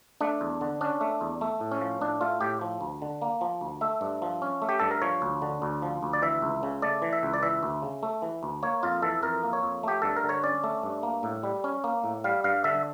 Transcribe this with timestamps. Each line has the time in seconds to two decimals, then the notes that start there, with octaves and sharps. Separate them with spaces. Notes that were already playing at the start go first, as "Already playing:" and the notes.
0.21 A3 D4
0.41 E2
0.61 D3
0.81 C#4 D4
1.01 A3
1.21 E2
1.41 A3
1.60 A2
1.72 C#4
1.81 F3
2.01 A2 D4
2.21 A3 F4
2.41 A2 G4
2.61 F3
2.81 D2
3.02 D3
3.22 A#3
3.41 F3
3.61 D2
3.81 A3 E5
4.01 G2
4.22 F3
4.42 C#4
4.62 A3
4.69 G4
4.80 G2 A4
4.91 A#4
5.02 F3 C#5
5.22 D2
5.42 D3
5.62 D2
5.82 F3
6.03 D2
6.13 D5
6.22 E3 E5
6.42 C#2
6.63 C#3
6.82 A3 D5
7.02 E3
7.13 E5
7.23 C#2
7.33 D5
7.43 E3 E5
7.63 D2
7.82 C#3
8.03 A3
8.22 E3
8.43 D2
8.63 A#3 C#5
8.83 F2 F4
9.02 E3 A4
9.22 F2 A#4
9.44 A#3
9.53 C#5
9.63 F2
9.83 A3 G4
10.02 G2 A4
10.16 A#4
10.24 D3
10.29 C#5
10.44 C#4 D5
10.64 A3
10.83 G2
11.03 A#3
11.23 A2
11.43 G3
11.64 C#4
11.84 A#3
12.04 A2
12.24 G3 F5
12.44 G2 F5
12.64 D3 E5